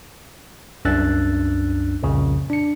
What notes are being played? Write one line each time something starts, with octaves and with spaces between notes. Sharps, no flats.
C2 F#2 D4 E6 F#6 A6
C2 F2 A#2 C#3
D4 C#7